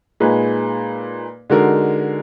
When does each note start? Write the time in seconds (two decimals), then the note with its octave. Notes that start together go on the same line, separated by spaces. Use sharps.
0.20 A#2 G#3 D#4 G#4 B4
1.50 D3 G#3 D#4 F#4 A#4